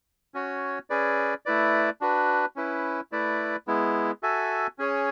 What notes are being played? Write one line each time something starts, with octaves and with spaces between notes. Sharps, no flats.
C#4 F#4 C#5
C#4 G#4 B4 D5
A3 E4 B4 D5
D4 F#4 B4
C#4 E4 B4
A3 E4 B4 D5
G#3 B3 E4
F#4 A4 E5 G#5
C#4 G#4 C#5